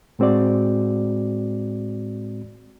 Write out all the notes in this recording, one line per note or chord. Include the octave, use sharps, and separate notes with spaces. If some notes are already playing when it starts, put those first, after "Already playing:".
A2 G#3 C4 F#4 D5